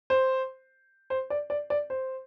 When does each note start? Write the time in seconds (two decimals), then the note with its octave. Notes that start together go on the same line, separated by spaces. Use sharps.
0.10 C5
1.10 C5
1.30 D5
1.50 D5
1.70 D5
1.90 C5